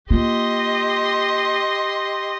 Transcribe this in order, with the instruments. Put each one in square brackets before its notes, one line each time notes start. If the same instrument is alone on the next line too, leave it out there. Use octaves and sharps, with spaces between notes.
[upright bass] A#3 F4 [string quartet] G4 D#5 C6